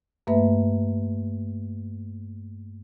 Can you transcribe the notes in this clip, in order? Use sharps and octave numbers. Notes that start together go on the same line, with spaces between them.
G2 A3 A#3 B4 E5